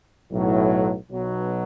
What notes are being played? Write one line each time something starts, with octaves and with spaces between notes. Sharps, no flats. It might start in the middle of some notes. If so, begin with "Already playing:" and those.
B1 A2 F#3
B1 B2 F#3